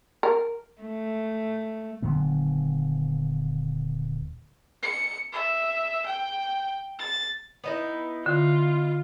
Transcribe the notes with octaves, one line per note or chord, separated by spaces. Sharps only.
A#4
A3
D#1 D3 F#3 B3
C#7
E5
G5
A6
B3 D#4 E4
D3 F4